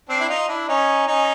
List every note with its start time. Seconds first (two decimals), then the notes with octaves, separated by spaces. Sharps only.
0.09 C4 D4
0.20 E4
0.29 D#4 F4
0.48 D4 E4
0.68 C#4 D#4
1.07 C#4 D#4